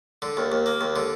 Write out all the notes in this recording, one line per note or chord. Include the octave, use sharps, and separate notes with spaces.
D3
D#2
D#2
A#3
D#2
D3